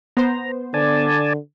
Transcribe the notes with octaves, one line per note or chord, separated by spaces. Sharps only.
B3 C5 A#5
D3 D5 G#5 A5